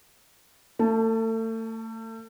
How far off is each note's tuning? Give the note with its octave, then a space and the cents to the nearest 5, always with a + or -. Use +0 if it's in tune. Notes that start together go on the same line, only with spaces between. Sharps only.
A3 +35 A5 +0